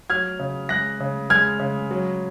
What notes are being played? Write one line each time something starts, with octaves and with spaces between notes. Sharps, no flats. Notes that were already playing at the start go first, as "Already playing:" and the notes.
F#3 F6 G#6
C#3
G#3 F#6 A#6
C#3
G#3 F6 G#6
C#3
F#3